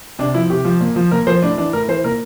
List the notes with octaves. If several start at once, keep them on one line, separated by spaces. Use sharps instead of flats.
C3 D4
F3 E4
C3 G4
F3
A#2
F3
A#2 A#4
F3 C5
A2 D4
E3 D4
A2 A#4
E3 C5
A#2 A#4